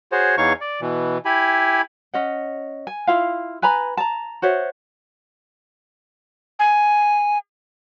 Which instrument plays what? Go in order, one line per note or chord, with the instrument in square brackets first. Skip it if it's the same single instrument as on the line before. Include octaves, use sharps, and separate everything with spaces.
[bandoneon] F#4 G#4 C5 C#5
E2 E3 D#4 C#5 F5 C#6
D5
B2 E3
E4 G4 G#5 B5
[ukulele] C#4 D#5 F#5
G#5
E4 F4 F5
B4 G#5 A#5 B5
A5 A#5
F#4 C5 C#5 E5
[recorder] G#5